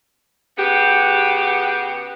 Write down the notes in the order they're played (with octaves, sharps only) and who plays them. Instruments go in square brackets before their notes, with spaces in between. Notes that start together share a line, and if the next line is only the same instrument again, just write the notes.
[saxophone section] C#3 B3 F#4 G4